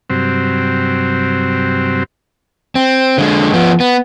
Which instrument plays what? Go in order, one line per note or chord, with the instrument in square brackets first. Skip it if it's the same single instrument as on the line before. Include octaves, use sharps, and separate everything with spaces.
[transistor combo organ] G2 C3 F#3 C4
[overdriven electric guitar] C4
D3 G#3
F3 B3
B3